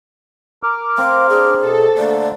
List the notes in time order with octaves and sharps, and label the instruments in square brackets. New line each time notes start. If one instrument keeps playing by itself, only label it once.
[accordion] A#4 D6 F6
[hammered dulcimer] C4 [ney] F5
[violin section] D4 [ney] G#4
[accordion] B2 [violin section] A4
[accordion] D3 A3 A#3 [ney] D5